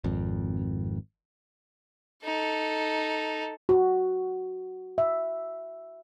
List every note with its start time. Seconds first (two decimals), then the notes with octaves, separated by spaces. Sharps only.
0.04 G#1 F2
2.24 D#4 A4
3.69 F#4
4.98 E5